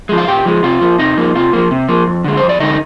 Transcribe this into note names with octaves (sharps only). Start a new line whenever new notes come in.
F3 G#3
F5
A#2 G4 G5
F3 G#3
C3 F4 F5
F3 A#3
C3 D#4 D#5
F3 A#3
C3 F4 F5
F3 A#3
C3
F3 A#3
F2
D3 G#3
C5
F2
D5
D3 G#3 D#4 D#5